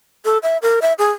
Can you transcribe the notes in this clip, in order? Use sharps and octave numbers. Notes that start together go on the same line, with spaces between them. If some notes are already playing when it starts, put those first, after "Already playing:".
A4
E5
A#4
E5
G#4